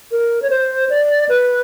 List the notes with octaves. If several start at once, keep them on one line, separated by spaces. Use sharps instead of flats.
A#4
C#5
C5
D5
B4